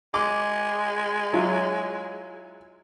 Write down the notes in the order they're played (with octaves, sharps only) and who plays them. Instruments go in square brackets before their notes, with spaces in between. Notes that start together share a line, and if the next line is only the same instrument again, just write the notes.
[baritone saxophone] G#3 [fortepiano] D6
[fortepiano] F#3 E4 F4